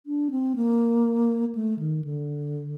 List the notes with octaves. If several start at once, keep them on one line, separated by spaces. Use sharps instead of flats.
D4
C4
A#3
A3
D#3
D3